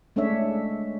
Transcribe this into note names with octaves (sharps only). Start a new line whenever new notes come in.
G#3 A3 C#4 D4 C#5 E5